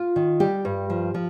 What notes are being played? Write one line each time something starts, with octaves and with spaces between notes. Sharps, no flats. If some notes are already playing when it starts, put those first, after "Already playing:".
Already playing: F4
D#3
G3 G4
G2
F3
F3